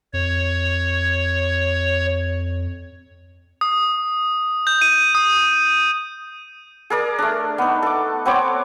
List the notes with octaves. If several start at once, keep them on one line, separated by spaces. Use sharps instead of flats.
F2 C#5
D#6
G6
D#7
D#6
G#4 A#4 D5
A3 D4
B3 D#4
A4 D6
B3 C4 C#5 D6